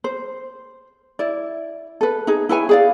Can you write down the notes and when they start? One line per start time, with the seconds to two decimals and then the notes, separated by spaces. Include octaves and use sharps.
0.04 C5
1.19 E4 D5
2.01 A4 B4
2.27 D#4 G#4
2.49 E4 B4 C#5 G#5
2.69 G#4 D5 F5